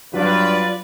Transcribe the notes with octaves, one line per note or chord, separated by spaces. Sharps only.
G2 F#3 F4 B4 D5